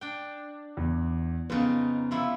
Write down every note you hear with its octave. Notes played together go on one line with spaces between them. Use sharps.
D4 G5
E2
F2 C#3 B3 D#4
C3 F3 E4